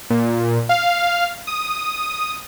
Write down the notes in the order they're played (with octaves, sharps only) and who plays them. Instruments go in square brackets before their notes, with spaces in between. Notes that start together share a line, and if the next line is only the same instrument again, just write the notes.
[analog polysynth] A#2
F5
D#6